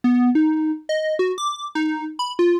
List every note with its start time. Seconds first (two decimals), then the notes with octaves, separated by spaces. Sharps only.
0.04 B3
0.35 D#4
0.89 D#5
1.19 F#4
1.38 D6
1.75 D#4
2.19 B5
2.39 F4